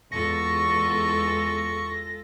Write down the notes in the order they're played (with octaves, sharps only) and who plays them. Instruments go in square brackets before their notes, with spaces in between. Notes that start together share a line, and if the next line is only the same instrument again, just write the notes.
[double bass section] E2 [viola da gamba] G#3 F4 A4 [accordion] C#6 [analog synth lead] A#6